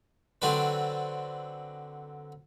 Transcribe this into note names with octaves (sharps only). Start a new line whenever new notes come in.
D3 F#3 C4 D4 B4